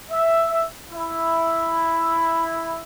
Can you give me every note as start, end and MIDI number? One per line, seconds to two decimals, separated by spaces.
0.10 0.65 76
0.91 2.82 64